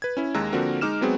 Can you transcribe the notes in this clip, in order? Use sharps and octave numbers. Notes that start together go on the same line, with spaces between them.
B4 G#6
C#4 E4
D#2 G#3 A#5 E6 F#6
D3 F3 A#3 C4 F#4 A#4
G#3 D#4 D6 F6 E7
F#3 G#3 B3 C4 F#4 G#4